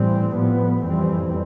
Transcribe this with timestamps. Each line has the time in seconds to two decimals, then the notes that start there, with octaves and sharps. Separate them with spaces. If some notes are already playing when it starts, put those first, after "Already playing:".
Already playing: A2 E3 G3 C4
0.35 A2 F3 B3
0.84 F2 E3 G3 C4